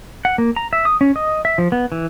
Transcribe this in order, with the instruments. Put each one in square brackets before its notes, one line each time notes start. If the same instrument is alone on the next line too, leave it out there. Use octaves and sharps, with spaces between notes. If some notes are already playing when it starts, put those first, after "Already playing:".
[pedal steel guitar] F#5
A#3
A#5
E5
D#6
C#4
D#5
E5
F3
B3
E3